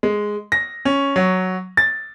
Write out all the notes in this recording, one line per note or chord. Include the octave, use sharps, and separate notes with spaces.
G#3
A#6
C#4
F#3
A6